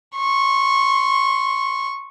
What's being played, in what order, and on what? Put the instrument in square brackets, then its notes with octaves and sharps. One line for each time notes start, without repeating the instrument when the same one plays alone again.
[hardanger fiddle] C6 C#6